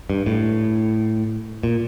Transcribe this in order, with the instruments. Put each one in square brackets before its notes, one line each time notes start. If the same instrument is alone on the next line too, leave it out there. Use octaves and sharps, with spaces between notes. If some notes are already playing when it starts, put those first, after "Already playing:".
[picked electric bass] G2
A2
A#2